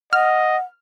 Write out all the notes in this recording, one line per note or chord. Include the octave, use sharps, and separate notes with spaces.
D#5 F#5 F6